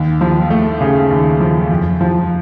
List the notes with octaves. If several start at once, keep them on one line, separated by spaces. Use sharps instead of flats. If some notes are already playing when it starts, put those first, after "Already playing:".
Already playing: D#2
F3
A3
C#3
D#2
F3
F2
F3